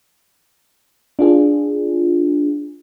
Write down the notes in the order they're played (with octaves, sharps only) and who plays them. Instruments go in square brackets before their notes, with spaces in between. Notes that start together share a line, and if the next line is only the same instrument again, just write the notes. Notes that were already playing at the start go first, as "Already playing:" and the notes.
[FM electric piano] D4 F4 G#4